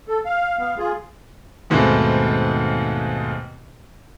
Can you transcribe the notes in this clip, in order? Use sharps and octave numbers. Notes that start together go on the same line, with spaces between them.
A4
F5
B3 F5
F4 G#4
D#2 G#2 B2 D#3 A3 C4